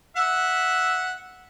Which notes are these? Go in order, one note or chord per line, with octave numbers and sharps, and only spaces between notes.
E5 F#5